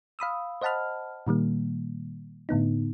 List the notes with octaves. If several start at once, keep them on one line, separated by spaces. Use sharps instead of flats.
F5 B5 D#6 E6
C5 D#5 F#5 A5 B5 F6
A#2 D#3 G3 A#3
A2 D3 B3 D#4